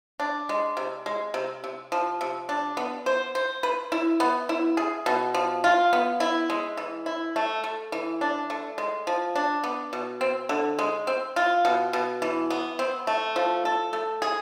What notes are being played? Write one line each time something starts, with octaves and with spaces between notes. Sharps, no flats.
D4
G#3
C3
G#3
C3
C3
F3
C3
D4
B3
C5
C5
B4
E4
B3
E4
G#4
B2
F3
F4
B3
E4
G#3
E3
E4
A3
A3
E3
D4
A3
G#3
F3
D4
B3
B2
C4
D3
G#3
C4
F4
B2
B2
E3
B3
C4
A3
F3
A4
A3
G#4